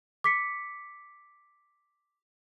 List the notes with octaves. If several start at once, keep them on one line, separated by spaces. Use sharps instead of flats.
D6 B6 C#7